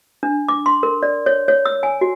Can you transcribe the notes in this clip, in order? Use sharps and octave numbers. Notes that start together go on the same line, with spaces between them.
D4
D6
C6
A#4
D5
C#5
C#5
E6
G#5
F#4